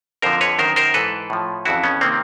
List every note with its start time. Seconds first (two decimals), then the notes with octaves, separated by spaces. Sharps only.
0.22 F2 D3 F3 A#4 C5
0.41 B4 C#5
0.58 F#2 D#3 A#4 C5
0.76 A#4 C5
0.94 G#2 E3 A4 B4
1.30 A2 F3
1.65 F2 C#3 E3 E4 F#4
1.83 B3 C#4
2.01 C3 D#3 A#3 C4